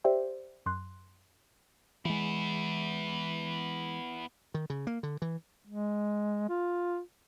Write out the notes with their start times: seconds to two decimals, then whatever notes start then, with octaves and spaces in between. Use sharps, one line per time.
0.04 G4 C5 D5 E5 G5
0.66 F#2 C6 F#6
2.05 E3 G#3 B3 E4
4.54 D#3
4.70 C#3
4.87 A#3
5.03 D3
5.22 E3
5.67 G#3
6.49 F4